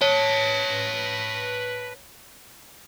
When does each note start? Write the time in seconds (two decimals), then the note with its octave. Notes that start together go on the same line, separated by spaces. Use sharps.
0.02 B4 C#5 A5